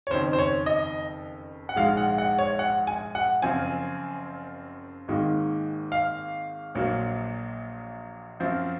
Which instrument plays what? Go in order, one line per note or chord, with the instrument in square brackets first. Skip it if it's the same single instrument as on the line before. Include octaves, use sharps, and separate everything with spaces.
[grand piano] C#5
F#1 F2 D#3 C5
C5
C#5
D#5
F#5
A#1 G#2 F3 G#3 F5
F#5
F#5
C#5
F#5
G#5
F#5
F#1 F#2 F3 C4 G#5
G#1 G#2 D#3 A#3
F5
A#1 A#2 F#3 A#3
F#2 F3 C4